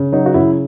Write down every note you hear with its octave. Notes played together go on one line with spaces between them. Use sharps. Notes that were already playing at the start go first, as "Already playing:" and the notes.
Already playing: C#3
F#3 D#4
F#4
C#3 E4